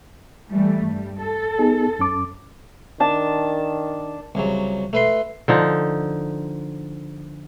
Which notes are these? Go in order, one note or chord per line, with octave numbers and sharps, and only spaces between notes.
E3 G3 A3
G2 G3
A4
B3 D#4 G#4
F#2 C#4 D6
D#3 D4 A5
C2 C#3 F#3
A3 B4 C6
D3 F3 D#4